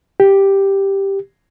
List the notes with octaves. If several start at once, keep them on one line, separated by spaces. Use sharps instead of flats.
G4